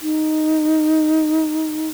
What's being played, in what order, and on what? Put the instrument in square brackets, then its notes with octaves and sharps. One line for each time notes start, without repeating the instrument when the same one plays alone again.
[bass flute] D#4